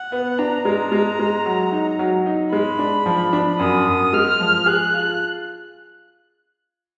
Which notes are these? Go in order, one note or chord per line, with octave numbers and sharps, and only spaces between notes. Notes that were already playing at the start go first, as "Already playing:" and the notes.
Already playing: F#5
B3
D4 A#5
G#3
G#3
G#3
F#3
D#4
F#3
D#4
G#3 B5
D4
F3
D4
F#2 D#6
F#2
G#3 F6
F3
G#4 F#6
F4